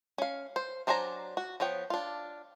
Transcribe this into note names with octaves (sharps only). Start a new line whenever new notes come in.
C#4 F5
C5
F#3 D4 C5 G#5 A#5
F#4
F3 B3 C#5 G5
D4 F4